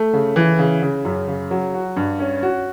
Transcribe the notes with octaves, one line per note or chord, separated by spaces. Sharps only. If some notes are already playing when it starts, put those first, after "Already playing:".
Already playing: A3
C#3
E3
C#3
C#3
F#2
C#3
F#3
F#4
G2
C#4
F#4